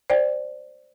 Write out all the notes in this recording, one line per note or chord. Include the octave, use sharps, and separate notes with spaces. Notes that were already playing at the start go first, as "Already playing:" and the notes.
C5 D5 G5